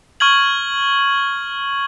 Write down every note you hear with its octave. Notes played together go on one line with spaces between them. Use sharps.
C#6 F6 G#6 F#7